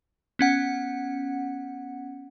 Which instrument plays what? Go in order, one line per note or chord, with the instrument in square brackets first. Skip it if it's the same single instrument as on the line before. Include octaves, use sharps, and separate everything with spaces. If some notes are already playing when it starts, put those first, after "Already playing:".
[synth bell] B3 C#4 F#5